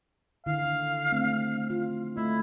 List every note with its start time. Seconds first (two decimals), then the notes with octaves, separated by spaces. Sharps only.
0.46 D3 D#3 E4 F5
1.12 A3 C4
1.70 F4
2.16 A3 E4 D#5